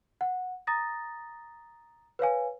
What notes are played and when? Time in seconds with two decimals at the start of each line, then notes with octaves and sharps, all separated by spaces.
0.21 F#5
0.67 A#5 D#6 A6 A#6
2.19 B4 C#5 F5 G#5